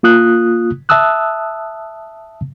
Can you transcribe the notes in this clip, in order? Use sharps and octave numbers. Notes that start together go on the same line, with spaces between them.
A#3 F4 D#6 F#6
E5 A5 D#6 E6 F#6